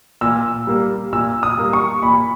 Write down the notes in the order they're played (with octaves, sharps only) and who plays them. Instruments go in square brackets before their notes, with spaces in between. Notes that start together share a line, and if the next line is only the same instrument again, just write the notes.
[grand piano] A#2 E6
G3 A#3
A#2 E6
D#6
G3 A#3
C#6
A#2 B5